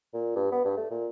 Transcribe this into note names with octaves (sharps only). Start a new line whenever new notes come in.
A#2
G2
B3
G2
A3
A#2